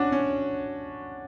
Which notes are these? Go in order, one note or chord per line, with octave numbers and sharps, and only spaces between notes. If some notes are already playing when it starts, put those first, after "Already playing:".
Already playing: C#4 D4 F#4
C#4